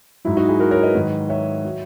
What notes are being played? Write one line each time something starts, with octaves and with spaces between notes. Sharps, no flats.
G#2 F#3 E4
D#4 F#4
E4 G#4
F#4 A#4
A#4 C#5
B4 D#5
G#2 D#3 F#3
C#5 E5
F#3